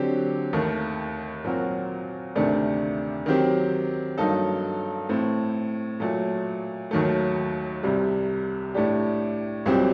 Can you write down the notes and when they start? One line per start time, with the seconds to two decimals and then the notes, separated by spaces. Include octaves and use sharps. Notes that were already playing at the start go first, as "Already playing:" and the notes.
Already playing: D3 F#3 C4 G4
0.53 D#2 D#3 A3
1.44 A#2 F#3 C4 F#4 A#4
2.35 D2 C3 D#3 A3 D4
3.26 D#3 F#3 C4 G4
4.18 G2 F#3 A#3 D#4 A4
5.09 A2 A3 C4
6.00 A#2 F#3 A3
6.91 D#2 D#3 F#3 A3
7.83 C2 C3 G3
8.74 A2 A3 D4 G4
9.66 C2 A#2 F#3 C4 G4